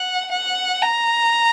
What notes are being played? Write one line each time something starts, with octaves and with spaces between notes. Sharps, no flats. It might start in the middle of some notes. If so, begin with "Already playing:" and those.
Already playing: F#5
F#5
A#5